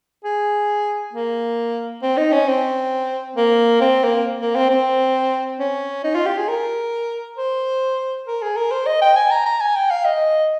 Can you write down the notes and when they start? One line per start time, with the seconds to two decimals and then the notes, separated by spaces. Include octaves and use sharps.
0.24 G#4
1.13 A#3
2.02 C4
2.17 D#4
2.32 C#4
2.48 C4
3.36 A#3
3.81 C4
4.04 A#3
4.40 A#3
4.55 C4
4.70 C4
5.60 C#4
6.04 D#4
6.15 F4
6.26 G4
6.38 G#4
6.48 A#4
7.38 C5
8.27 A#4
8.42 G#4
8.57 A#4
8.71 C5
8.86 D#5
9.02 G5
9.16 G#5
9.31 A#5
9.46 A#5
9.61 G#5
9.76 G5
9.91 F5
10.05 D#5